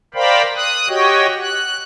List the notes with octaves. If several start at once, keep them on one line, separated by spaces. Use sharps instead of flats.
A#4 C5 D5 F5 G5 B5
D#6 F#6
F#4 G4 C#5 D#5 G5
F#6